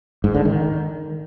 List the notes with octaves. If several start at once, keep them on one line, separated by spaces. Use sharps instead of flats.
G#2
D3
D#3